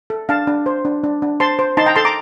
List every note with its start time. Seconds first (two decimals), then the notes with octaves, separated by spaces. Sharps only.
0.10 A4
0.29 D4 F5 A5
0.47 D4
0.66 C5
0.85 D4
1.04 D4
1.22 D4
1.40 C5 A5 C6
1.59 C5
1.77 D#4 A5 C6
1.86 G5 A#5
1.96 A4 A5 C6
2.05 A#5 D6